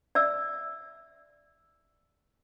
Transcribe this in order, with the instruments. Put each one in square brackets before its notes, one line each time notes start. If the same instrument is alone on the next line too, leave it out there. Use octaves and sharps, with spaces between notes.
[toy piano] D5 E5 E6